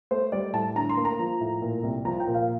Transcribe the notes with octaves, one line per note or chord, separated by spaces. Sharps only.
A3 C5
G3 D5
A2 A5
D3 A#5
C6
A#3
A#5
F3
A2
A#2
C2
F3 A#5
G5
A#2
F5